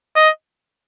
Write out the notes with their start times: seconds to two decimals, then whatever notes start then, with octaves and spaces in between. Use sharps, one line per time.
0.16 D#5